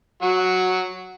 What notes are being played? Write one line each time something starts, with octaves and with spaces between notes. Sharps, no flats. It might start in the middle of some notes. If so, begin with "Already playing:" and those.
F#3 F#4